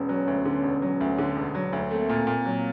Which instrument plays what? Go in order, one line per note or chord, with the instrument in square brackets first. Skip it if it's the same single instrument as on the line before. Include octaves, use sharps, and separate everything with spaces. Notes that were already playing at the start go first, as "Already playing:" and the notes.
Already playing: [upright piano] E1 [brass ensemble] B3 C#4
[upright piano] F#3
D2
D3
E1
F#3
D2
D3
E1
F#3
D2
[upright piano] A3 [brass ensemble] A#3 C4
[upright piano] A#2
A#2
F#3